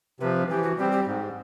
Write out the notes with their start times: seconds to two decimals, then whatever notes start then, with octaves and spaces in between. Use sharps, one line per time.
0.20 C3 F3 B4
0.50 E3 G4
0.64 F#4
0.77 G3 C4 G4
0.92 G4
1.07 G#2